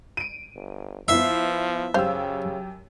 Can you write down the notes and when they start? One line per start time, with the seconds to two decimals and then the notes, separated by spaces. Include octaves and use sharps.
0.17 D7 D#7
0.55 G1
1.08 F3 B3 E4 E5 C7
1.94 F#2 C#3 G4 C5 F5 E6